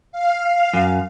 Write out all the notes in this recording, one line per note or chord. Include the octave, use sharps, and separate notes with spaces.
F5
F#2